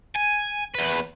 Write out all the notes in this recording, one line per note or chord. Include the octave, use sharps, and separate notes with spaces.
G#5
E2 B4